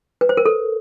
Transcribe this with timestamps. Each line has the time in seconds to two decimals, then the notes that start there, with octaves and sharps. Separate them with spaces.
0.21 B4
0.29 C5
0.37 A#4
0.46 A4